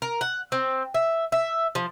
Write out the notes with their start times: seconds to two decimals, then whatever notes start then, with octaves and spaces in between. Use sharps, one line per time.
0.02 A#4
0.21 F#5
0.52 C4
0.94 E5
1.32 E5
1.75 F3